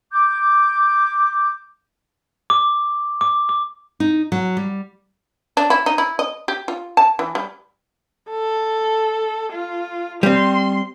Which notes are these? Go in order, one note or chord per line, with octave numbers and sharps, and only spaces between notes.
D6 G6
D6
D6
D6
D#4
F#3
G3
D4
E4
D#4
E4
D#5
G4
F4
A5
E3
G3
A4
F4
G3 C4 C6